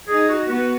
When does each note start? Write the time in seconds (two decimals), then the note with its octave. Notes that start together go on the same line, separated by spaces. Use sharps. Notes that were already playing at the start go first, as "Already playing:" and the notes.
0.08 D#4 G#4
0.29 F#4
0.49 B3 F#4